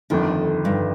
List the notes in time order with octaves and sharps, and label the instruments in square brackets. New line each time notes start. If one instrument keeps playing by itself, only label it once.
[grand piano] G1 F2 D#3 [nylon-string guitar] D3
[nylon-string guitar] G2